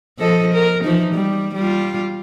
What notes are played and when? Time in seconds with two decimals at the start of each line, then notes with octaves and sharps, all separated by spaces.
0.19 F3 A4 D#5
0.54 A#4
0.84 E3 F3 D#4
1.14 G3
1.55 G3 F4